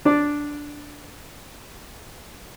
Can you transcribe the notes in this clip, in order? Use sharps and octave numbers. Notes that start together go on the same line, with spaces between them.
D4 D5